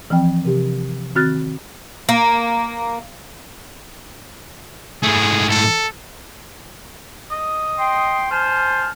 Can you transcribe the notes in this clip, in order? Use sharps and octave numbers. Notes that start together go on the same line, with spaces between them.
E3 F3 C4 G5
C3 G4
D#3 C4 F#4 F6 F#6 A6
A#3
G#2 A3 G#4
A4
D#5
G5 C6
C5 G#5 A5 F6